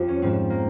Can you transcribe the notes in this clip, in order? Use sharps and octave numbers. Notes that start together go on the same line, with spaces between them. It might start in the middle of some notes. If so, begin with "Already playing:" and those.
Already playing: F2 F4 G4
C#4
G#2 F3 C4
A#3